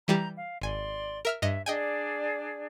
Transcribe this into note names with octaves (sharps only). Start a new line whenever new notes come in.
E3 G3 G4 A#5 G6
F5
G#1 D5 G#5 C6
A#4 E5 F6
G2 D#5 E5
D4 G#4 D5 D#5 G5 G#5